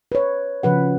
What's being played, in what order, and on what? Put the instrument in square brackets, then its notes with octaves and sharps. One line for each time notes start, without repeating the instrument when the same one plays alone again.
[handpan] B4 C#5
C#3 F3 B4 F#5